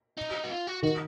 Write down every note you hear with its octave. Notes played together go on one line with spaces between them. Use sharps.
D#4
F#4
F4
F#4
D#3 F#4